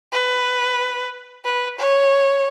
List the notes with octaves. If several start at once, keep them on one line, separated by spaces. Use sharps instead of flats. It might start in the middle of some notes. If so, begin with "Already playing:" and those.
B4
B4
C#5